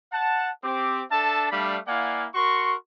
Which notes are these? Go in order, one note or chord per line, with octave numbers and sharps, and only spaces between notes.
F#5 A5
C4 G4 D6
D4 A4 E5 A5
G3 A3 D4 F5 B5
A#3 E4 D5 F5 F#5 G#5
F#4 A#4 C6 C#6